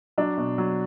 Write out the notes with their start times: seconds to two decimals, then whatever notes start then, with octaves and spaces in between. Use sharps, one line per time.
0.18 F#3 D4
0.37 B2
0.58 F#3